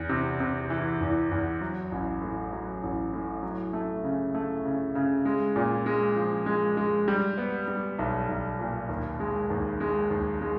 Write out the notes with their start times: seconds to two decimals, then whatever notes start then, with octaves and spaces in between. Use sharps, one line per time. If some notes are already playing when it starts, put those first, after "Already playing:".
Already playing: E2
0.09 C3
0.40 C3
0.70 E3
1.01 E2
1.31 E2
1.61 F#3
1.92 A1
2.22 A2
2.53 F#3
2.83 A1
3.13 A2
3.43 F#3
3.73 A3
4.04 C#3
4.35 A3
4.65 C#3
4.95 C#3
5.25 G#3
5.56 A#2
5.86 G#3
6.16 F3
6.46 G#3
6.77 G#3
7.08 G3
7.38 B3
7.68 G3
7.99 B1
8.28 B1
8.59 A#2
8.89 D#2
9.20 G#3
9.50 D#2
9.80 G#3
10.10 D#2
10.41 G#3